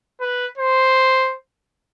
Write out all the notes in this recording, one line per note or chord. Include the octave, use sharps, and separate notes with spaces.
B4
C5